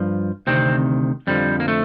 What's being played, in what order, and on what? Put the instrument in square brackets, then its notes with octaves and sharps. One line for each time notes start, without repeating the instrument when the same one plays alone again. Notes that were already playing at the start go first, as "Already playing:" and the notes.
Already playing: [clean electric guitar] G2 F3
D2 C3 D#3 C4
F2 D3 F3 G3
A#3
A3